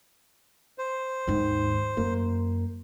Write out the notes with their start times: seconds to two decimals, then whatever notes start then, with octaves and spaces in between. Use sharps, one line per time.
0.78 C5
1.27 D#2 G#2 D#3
1.97 F#2 A#3